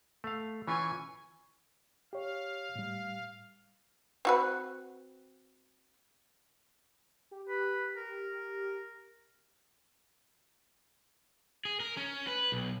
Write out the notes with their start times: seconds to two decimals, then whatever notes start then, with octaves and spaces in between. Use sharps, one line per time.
0.24 A3 F5
0.67 E3 C#4 F4 G#5 C#6
2.13 G4 C#5 F5
2.76 A2 G3
4.25 C4 F#4 B4
7.31 G4
7.49 B4
7.96 A#4
11.65 G#4
11.80 A#4
11.97 C#4
12.27 B4
12.52 B1